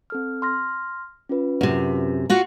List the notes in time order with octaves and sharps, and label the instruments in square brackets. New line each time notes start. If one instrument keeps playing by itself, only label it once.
[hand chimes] C4 A4 F6
C6 F6 A#6
C#4 F4 B4
[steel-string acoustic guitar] F#2 C3
F4 F#4 F#5